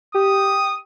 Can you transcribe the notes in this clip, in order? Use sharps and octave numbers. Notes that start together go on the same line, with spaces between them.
G4 D#6